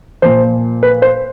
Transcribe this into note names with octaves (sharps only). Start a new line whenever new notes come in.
A#2 F3 C5
B4
C5